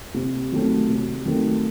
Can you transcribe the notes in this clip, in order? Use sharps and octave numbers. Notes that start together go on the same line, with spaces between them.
C3
D#3 F#3 A3 C4
C3
D#3 F#3 A3 C4